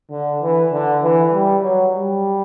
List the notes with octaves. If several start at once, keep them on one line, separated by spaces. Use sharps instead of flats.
D3
E3
D3
E3
G3
F#3
G3